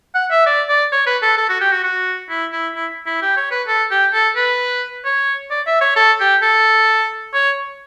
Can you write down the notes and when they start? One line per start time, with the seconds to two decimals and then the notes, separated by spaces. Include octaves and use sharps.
0.15 F#5
0.31 E5
0.46 D5
0.69 D5
0.92 C#5
1.07 B4
1.23 A4
1.38 A4
1.49 F#4
1.61 G4
1.72 F#4
1.84 F#4
2.30 E4
2.52 E4
2.75 E4
3.06 E4
3.22 G4
3.37 C#5
3.52 B4
3.68 A4
3.91 G4
4.13 A4
4.36 B4
5.05 C#5
5.51 D5
5.66 E5
5.81 C#5
5.96 A4
6.20 G4
6.42 A4
7.34 C#5